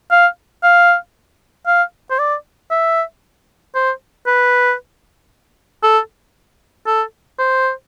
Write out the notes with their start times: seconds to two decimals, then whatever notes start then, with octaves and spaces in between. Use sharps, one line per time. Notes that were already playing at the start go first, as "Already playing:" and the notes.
0.11 F5
0.63 F5
1.67 F5
2.10 C5
2.19 D5
2.71 E5
3.75 C5
4.26 B4
5.83 A4
6.86 A4
7.39 C5